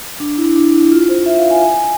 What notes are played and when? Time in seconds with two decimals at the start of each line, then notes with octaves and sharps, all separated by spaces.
0.20 D4
0.38 E4
0.56 D4
0.74 E4
0.91 F4
1.09 C5
1.26 E5
1.38 F5
1.50 G#5
1.62 G#5